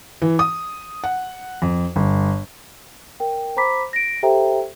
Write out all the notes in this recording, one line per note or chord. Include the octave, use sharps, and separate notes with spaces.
E3
D#6
F#5
F2
G1
A#4 G5
C5 A#5 B5 D6 B6
A#6 D7
G4 A4 C5 E5 G5 A#5